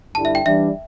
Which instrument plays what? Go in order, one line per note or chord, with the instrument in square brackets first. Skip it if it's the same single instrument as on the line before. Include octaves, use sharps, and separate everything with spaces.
[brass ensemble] G2 D3 G3 E4 [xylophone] A5
[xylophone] E5
G5
[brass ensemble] E3 G3 D4 [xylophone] E5